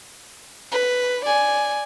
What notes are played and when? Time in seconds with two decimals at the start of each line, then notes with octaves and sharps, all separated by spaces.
0.72 B4
1.26 D5 G#5